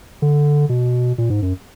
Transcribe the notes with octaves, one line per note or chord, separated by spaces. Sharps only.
D3
B2
A#2
G#2
F#2